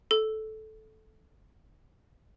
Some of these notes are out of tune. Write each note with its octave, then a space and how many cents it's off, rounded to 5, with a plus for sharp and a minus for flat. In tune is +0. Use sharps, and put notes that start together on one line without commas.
A4 -15